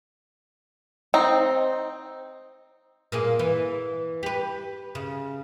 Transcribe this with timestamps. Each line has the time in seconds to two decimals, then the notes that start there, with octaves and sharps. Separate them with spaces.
1.14 C4 D#4
3.12 A#2 A#3 G#4
3.39 E3
4.23 G4 B4
4.95 C#3